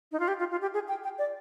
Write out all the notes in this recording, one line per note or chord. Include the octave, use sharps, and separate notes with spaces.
D#4
F4
G4
F4
F4
G4
G#4
G5
G5
D5